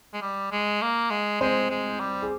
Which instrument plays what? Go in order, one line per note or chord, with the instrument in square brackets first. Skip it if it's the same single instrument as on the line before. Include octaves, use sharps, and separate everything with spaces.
[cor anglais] G#3
G3
G#3
A#3
G#3
[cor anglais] G#3 [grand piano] C4 C5
[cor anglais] G#3
G3
[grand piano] G#4